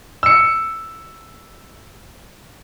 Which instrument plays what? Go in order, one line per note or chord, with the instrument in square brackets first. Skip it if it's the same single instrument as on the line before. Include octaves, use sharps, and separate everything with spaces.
[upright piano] E6 C#7